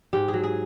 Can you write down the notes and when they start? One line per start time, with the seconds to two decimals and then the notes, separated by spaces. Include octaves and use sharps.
0.13 G#2 G4
0.28 G#4
0.34 F#3
0.44 G#4